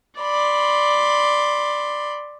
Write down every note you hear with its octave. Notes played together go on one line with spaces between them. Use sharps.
D5 B5 C6